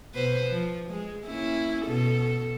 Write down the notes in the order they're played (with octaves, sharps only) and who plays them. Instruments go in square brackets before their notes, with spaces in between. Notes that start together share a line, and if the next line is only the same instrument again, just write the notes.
[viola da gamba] B2 B4 C5
F3
G#3
A#3 C#4 E4
B2 A4